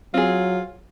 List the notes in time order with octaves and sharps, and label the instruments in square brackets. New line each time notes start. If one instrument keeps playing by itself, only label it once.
[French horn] F#3 [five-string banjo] C4 G#4 [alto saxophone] F4